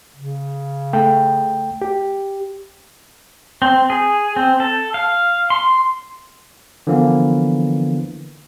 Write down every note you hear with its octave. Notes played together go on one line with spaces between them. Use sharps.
C#3
A3 G5
G4
C4
G#4
C4
A4
F5
C6
D3 E3 F3 A#3 B3